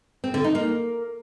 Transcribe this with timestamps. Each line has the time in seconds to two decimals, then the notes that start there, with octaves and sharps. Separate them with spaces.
0.24 C4
0.34 D3
0.44 D#4
0.55 A#3